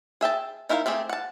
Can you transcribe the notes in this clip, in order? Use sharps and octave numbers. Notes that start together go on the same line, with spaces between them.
G#4 E5 G5 A5
D#4 E4 A#4 D5 F5
A3 C4 G4 G#4
F#5 A5